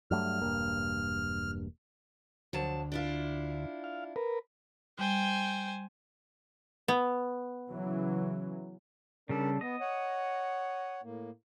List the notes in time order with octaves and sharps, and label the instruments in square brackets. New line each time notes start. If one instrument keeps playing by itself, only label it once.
[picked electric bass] G2 F#3 A3 [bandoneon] F6
[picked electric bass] E1 G2 A#3
[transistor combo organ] D2 [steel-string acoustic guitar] F3 F#3 A5
[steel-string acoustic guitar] D4 E4 F4
[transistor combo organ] F5
A#4 B4
[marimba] G3 [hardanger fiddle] C5 G#5 [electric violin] G5
[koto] B3
[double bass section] C#3 E3 F#3
[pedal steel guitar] C#3 G3 A4 [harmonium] D4 A#4 D5
[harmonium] B3 [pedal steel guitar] D#5
[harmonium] C#5 F#5
A2 A#3